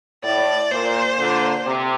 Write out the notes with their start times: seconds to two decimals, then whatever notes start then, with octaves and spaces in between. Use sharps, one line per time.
0.23 A2 D5
0.71 A#2 C5
1.18 A#2 D3
1.65 C3